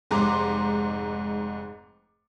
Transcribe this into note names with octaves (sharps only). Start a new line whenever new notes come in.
F1 G#2 A#5 C6 D6